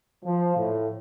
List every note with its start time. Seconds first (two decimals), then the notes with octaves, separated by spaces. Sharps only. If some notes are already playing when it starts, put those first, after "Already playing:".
0.25 F3
0.57 A2